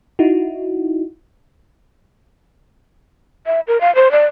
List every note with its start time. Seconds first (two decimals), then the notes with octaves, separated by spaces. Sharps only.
0.19 D#4 E4 F#4
3.46 E5
3.68 A#4
3.81 F5
3.95 C5
4.11 D5